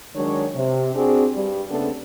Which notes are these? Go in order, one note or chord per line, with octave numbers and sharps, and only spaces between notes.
D#3 F#3 G#3 D4 C#5
C3
C4 D4 F#4 G#4
G2 G3
C#3 A3 B3 C4 D4 A4